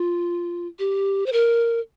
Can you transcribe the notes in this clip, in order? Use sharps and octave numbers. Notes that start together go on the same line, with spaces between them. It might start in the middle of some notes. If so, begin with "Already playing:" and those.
Already playing: F4
G4
C5
A#4